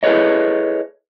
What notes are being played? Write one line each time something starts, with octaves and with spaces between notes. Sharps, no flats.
E4 G#4 A4 B4 C#5 D#5